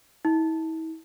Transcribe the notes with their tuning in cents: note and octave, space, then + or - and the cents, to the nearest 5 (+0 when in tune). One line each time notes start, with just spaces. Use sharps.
E4 -40